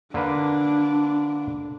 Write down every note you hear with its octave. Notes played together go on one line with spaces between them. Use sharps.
D3 A#3 D4 B4